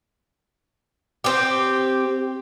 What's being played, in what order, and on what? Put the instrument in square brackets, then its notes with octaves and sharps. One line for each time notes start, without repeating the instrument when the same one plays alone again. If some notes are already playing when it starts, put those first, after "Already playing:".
[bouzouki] C4 G4